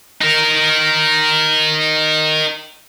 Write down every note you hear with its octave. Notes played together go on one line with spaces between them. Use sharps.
D#4 A#4